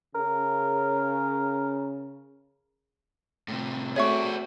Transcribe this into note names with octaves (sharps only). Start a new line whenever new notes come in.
C#3 A#4
A2 C3
A3 C4 F#4 G#4 C#5 D5 E5 C#6